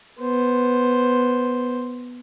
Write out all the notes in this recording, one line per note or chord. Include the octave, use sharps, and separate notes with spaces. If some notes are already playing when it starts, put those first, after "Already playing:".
B3 C5